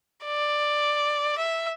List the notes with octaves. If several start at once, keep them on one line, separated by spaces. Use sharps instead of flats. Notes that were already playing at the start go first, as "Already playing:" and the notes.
D5
E5